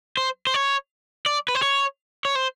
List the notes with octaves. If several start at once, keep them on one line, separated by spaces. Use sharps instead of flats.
C5
C5
C#5
D5
B4
C5
C#5
C#5
C5